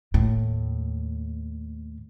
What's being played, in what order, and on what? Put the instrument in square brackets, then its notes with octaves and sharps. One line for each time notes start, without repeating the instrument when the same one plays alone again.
[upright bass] D#2 A2